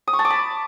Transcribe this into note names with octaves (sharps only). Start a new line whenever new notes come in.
D#6
C#6
A5
D6
B5